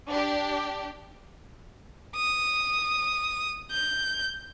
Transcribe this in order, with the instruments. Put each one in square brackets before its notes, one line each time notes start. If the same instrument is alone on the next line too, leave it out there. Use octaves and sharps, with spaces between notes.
[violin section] D4 G4
[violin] D#6
G6